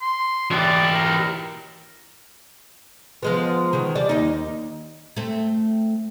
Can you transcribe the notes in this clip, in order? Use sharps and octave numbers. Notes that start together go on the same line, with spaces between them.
C6
E3 G4 D5
A#4
F3 G#3 B3
D#3 E3
G3 D5
D#2 D#4
A3 C4